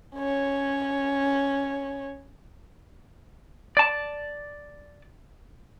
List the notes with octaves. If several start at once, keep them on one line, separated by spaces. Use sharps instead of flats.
C#4 C#5
D5 A5